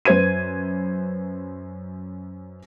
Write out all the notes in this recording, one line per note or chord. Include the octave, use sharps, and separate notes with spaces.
F#2 B4 C5 G#6 D#7